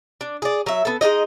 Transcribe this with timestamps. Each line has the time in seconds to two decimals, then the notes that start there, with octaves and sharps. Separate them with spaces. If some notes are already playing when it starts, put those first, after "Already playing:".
0.21 D4
0.42 G#4 D5
0.66 F#3 E5
0.85 B3 A4
1.01 G#3 A#3 D#4 D#5